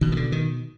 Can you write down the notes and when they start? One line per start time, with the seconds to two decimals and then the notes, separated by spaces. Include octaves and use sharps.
0.01 B2 D#3
0.12 D#3
0.17 D3
0.32 D#3